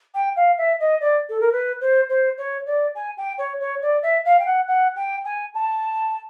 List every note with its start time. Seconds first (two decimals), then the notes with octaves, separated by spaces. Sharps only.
0.14 G5
0.36 F5
0.57 E5
0.80 D#5
1.00 D5
1.29 A4
1.40 A#4
1.52 B4
1.81 C5
2.09 C5
2.37 C#5
2.66 D5
2.95 G#5
3.17 G5
3.38 C#5
3.60 C#5
3.82 D5
4.03 E5
4.25 F5
4.39 G5
4.46 F#5
4.67 F#5
4.96 G5
5.25 G#5
5.54 A5